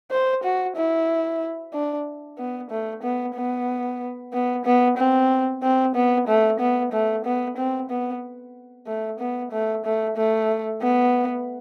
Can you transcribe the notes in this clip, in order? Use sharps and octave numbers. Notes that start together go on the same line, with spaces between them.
C5
F#4
E4
D4
B3
A3
B3
B3
B3
B3
C4
C4
B3
A3
B3
A3
B3
C4
B3
A3
B3
A3
A3
A3
B3